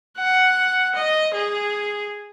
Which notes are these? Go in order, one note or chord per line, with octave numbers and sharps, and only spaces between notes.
F#5
D#5
G#4